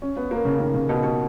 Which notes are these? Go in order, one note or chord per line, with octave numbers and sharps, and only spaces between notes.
C#4
B3
A#3
C#3
D#3
C#3
B2
B2